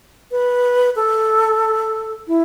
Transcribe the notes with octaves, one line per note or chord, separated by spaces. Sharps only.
B4
A4
E4